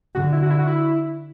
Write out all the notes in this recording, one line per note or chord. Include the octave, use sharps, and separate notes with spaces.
D3 F#4
E4
F#4
E4
F#4
E4